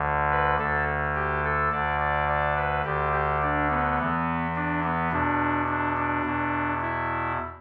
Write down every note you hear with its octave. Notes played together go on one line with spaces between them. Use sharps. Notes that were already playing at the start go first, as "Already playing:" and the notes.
Already playing: D2 D3
B4
D2 D3 A4
G4
A4
D2 D3 D5
D5
D5
B4
D2 D3 G4
G4
D4
B3
E2 E3
D4
B3
E2 B2 D4
D4
D4
E2 B2
E4